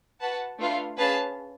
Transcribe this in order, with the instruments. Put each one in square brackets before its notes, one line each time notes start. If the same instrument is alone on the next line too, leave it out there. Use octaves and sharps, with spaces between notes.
[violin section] F#4 B4 F#5 A5
A3 D4 F4 B4 F5
C#4 G#4 B4 F5 A5